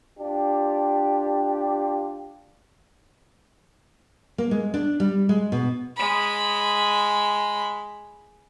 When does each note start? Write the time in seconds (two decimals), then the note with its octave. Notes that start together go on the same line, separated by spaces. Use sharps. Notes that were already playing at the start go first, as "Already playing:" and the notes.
0.19 D4 F4 G4
4.38 A#3
4.51 G#3
4.74 D4
5.00 G3
5.29 G#3
5.52 B2
5.97 G#3 B5